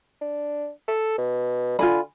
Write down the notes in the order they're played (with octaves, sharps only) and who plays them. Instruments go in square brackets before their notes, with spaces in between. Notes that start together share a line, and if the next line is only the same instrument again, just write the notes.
[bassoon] D4
A4
B2
[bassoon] D3 [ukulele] F4 G#5 B5